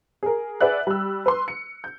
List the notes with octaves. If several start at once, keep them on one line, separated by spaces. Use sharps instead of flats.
G#4 A#4
G#4 B4 D5 E5 F#5 F#6
G3 E6
B4 C6
C#7
G6